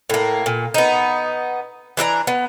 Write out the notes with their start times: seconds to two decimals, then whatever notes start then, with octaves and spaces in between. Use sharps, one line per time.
0.10 A2 A#3
0.46 A#2
0.74 B3 D#4
1.97 E3 D4 E5 A#5
2.27 B3